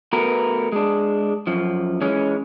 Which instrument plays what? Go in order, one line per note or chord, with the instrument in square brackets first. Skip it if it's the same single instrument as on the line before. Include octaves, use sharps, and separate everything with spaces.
[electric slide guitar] A3 B3 F#4 A#4 B4
G#3 D4
F#2 F3
E3 G#3 C#4